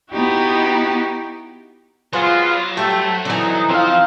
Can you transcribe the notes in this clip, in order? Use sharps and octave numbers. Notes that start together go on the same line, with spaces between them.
B3 D#4 E4 F#4 G4
F#3 G#3 B3 F4 C5
G2 A3 G5
D3 E3 D#4
F3 C4 C5 F5